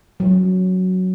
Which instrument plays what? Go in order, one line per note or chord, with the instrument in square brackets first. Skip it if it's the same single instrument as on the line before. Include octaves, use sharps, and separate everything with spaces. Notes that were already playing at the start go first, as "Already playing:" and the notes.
[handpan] F#3